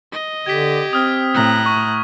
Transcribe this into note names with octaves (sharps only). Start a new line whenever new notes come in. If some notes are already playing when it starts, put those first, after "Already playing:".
D#5
D3 G4 G#6 B6
C4 D#6 F6 G#6
A2 A#5 F#6
C#6